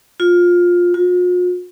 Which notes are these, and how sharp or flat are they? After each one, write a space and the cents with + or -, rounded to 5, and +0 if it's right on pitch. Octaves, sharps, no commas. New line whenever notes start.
F4 +15
F4 +45